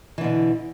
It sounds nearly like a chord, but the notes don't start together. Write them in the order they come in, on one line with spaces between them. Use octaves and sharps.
E3 D3 B2